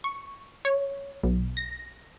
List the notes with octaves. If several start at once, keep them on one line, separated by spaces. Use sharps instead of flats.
C#6
C#5
B1
A#6